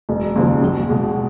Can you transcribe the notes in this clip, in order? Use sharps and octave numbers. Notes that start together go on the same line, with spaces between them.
E1
D#2 C#3 F3
B1
B2 G#3